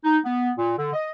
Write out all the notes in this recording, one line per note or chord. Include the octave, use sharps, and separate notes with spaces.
D#4
B3
A#2
D3
D#5